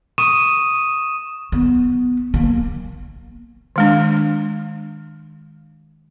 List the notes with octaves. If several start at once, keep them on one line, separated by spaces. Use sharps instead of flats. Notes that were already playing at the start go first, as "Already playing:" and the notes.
C#6 D#6 D#7 E7
B3
A#3
D#3 G#3 D4